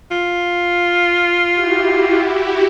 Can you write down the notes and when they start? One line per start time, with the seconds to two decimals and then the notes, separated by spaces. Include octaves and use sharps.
0.11 F4
1.53 E4 F#4 G4